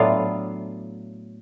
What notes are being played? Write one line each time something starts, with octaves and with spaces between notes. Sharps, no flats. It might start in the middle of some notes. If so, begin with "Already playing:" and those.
Already playing: A2 F#3 B3 D4 F4